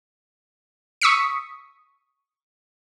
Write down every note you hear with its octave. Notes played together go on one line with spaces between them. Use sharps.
C#6 D#6 E6 B6 C#7